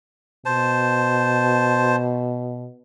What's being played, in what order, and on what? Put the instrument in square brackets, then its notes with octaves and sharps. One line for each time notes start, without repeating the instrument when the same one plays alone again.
[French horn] B2 [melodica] C5 A5